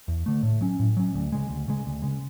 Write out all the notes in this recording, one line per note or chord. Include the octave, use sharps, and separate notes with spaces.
E2
D3 A3
A2
F#3 C#4
A2
F#3 C#4
D2
C#3 G#3
D2
C#3 G#3
D2
C#3 G#3